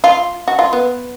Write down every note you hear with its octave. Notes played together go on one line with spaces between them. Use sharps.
F4
F#4
F4
B3